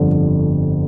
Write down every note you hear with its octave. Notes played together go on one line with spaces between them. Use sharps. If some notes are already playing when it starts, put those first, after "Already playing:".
Already playing: G1 F2 D3